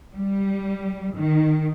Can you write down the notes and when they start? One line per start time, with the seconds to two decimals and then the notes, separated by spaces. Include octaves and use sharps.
0.12 G3
1.15 D#3